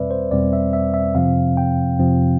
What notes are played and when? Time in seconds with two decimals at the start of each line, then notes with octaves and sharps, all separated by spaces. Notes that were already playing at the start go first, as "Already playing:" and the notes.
Already playing: E2 B2 G3 C4 B4 D5 E5
0.11 C5
0.31 E2 B2 G3 C4 D5
0.53 E5
0.73 E5
0.94 E5
1.15 F2 C3 F3 C4 F5
1.57 G5
1.98 F2 C3 F3 C4